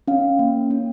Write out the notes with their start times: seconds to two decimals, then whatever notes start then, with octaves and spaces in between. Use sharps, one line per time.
0.08 C#4 F5
0.39 A#3
0.71 C#4